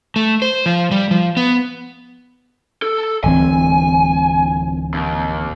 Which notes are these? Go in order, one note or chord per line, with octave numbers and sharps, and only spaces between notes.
A3
C5
F3
G3
F3
B3
A4
D1 E3 C4 G#5
D#2